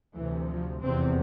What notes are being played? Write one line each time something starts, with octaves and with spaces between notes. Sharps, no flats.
D2 C3 E3
F3
F1 E2 C3 C4